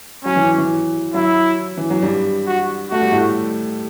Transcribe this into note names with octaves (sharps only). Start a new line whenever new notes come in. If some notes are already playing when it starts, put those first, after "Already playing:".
F#3 C#4
E3
E3
F#3 E4
E3
F#3
G2 G3
F#4
A3 F#4
G3
A2 A3